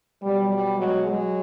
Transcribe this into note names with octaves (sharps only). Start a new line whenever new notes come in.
B2 F#3 G3
G3
F#3 G#3
F#3 G#3